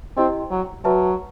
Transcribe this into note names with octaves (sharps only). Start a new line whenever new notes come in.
C4 E4 G4 D#5
F#3
F#3 F#4 B4 E5 A5